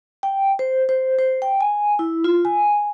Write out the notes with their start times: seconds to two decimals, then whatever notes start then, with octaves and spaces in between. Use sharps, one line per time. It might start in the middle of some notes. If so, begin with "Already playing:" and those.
0.23 G5
0.59 C5
0.89 C5
1.19 C5
1.42 G5
1.61 G#5
1.99 E4
2.24 F4
2.45 G#5